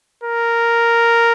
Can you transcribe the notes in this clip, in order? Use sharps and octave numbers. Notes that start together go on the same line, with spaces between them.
A#4